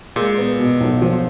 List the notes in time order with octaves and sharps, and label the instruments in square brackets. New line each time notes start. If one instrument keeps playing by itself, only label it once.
[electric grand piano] A#2 [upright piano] G#3
[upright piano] B3
B2
B1
[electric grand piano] A#2 [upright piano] F3